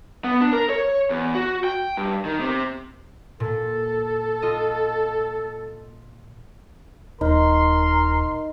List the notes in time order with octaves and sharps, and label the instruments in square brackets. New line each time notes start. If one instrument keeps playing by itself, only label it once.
[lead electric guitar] B3
D4
A#4
C#5
E2
F#4
G5
G2
D#3
C3
[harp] A#2 [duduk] A4
[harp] F4 D#5
[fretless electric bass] D#1 [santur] D#4 [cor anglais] A#4 [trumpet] C6